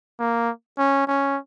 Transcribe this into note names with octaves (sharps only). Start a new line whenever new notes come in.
A#3
C#4
C#4